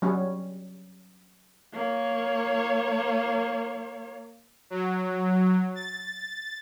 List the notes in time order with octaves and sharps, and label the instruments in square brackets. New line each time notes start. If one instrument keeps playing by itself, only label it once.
[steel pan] F#3 G3 C#4
[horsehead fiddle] A#3 C#5
[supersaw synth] F#3
A6